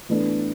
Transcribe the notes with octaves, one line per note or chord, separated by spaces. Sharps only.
A2 E3 B3 D4 A4